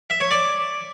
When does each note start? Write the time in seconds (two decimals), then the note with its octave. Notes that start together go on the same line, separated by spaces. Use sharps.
0.10 E5
0.20 C#5
0.31 D5